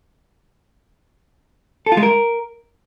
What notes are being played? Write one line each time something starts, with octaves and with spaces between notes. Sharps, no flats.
A4
F4
G#3
A#4